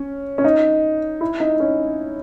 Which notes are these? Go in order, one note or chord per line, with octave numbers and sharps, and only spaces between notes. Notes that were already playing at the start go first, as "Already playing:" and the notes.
Already playing: C#4
C#4
D#4
E4
D#4
C#4